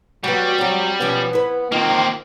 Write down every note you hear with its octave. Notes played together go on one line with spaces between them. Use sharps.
F#3 G3 B3 F#4
F#3 C4 F#4
B2 F3 B3 C#4
E4 B4
D#3 A#3 C4 F4